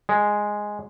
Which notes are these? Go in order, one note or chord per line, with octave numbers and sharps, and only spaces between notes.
G#3